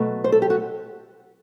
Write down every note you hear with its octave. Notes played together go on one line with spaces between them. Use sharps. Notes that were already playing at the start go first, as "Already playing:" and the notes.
Already playing: B2 F#3 A3
C5
A4
G4
F#4